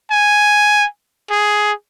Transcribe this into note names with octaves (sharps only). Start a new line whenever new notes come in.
G#5
G#4